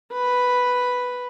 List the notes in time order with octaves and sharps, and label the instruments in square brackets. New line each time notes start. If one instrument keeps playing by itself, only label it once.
[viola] B4